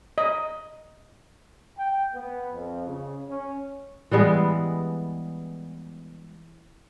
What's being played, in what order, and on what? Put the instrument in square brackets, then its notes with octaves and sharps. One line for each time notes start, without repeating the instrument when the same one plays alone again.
[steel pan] D#5
[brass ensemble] G5
B3
F2
C#3
C#4
[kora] E3 G3 G#3 B3